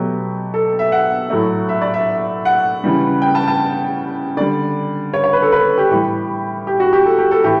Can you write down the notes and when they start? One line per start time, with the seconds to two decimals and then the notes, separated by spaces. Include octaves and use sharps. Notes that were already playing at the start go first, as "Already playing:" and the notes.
Already playing: B2 F#3 A3 G4
0.54 A4
0.79 E5
0.92 F#5
1.30 A2 F#3 A3
1.69 E5
1.81 D5
1.94 E5
2.45 F#5
2.84 C#3 E3 G3
3.22 G5
3.35 A5
3.48 A5
4.37 D3 G3 D5
5.14 C#5
5.24 C#5
5.33 B4
5.42 A4
5.52 B4
5.78 G4
5.90 A2 E3 G3 G4
6.67 G4
6.80 F#4
6.93 G4
7.05 A4
7.18 G4
7.31 A4
7.44 A2 E3 G4